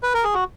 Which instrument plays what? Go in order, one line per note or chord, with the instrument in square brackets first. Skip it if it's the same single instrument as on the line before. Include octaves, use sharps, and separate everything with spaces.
[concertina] B4
A#4
G#4
F#4